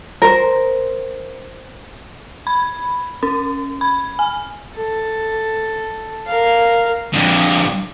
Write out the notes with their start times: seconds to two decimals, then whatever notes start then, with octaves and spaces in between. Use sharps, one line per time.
0.22 A#4 C5
2.47 B5
3.23 C#4
3.81 B5
4.19 G#5
4.76 A4
6.27 A#4 F5
7.14 F2 D3